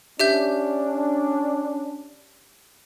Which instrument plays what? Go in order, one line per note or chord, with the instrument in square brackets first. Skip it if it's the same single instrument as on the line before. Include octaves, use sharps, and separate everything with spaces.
[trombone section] C#4 D4 [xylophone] G4 E5 G6